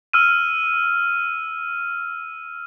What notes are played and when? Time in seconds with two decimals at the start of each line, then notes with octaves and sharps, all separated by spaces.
0.13 E6 F6 D#7